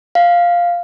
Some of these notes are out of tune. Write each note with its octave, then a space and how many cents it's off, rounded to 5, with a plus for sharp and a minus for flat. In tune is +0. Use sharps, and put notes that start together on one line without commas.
F5 +0